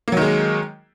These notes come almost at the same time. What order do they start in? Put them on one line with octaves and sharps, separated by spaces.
A#3 F#3 D#3 G#3